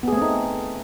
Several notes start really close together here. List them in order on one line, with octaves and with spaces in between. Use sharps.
B3 G#4 A3 C4 D#4